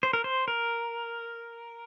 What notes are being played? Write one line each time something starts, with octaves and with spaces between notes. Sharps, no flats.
C5
A#4
C5
A#4